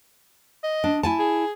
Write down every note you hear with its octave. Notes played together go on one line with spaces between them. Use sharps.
D#5
D4
E4 G#5 A5
G#4